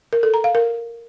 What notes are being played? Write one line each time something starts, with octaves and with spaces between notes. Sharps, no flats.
A#4
A4
A#5
F5
A#4